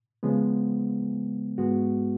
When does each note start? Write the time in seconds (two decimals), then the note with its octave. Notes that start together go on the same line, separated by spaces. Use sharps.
0.23 C#3 F3 G#3 B3
1.58 G#2 G#3 B3 F#4